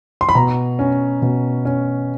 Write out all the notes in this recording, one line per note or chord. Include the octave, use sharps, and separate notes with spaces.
C6
B5
B2 A#5
C#4
B2
C#4